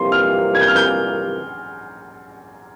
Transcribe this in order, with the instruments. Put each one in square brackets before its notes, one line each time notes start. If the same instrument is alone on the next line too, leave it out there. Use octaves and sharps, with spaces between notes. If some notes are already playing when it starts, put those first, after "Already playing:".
Already playing: [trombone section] F2 C3 E3 G3 A#3 [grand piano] C6
[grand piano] F6
G#6
G6
F6
G6